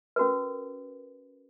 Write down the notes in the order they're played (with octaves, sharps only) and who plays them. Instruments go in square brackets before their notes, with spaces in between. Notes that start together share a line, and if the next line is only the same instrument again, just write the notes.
[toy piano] C#4 F#4 A#4 B4